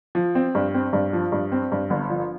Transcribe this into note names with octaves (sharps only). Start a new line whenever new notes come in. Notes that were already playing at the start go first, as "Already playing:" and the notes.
F3
C4
G2
C4
G2
F3
G2
C4
G2
G1
F3